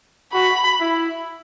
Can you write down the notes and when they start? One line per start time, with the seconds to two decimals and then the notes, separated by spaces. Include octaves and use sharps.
0.34 F#4 B5
0.81 E4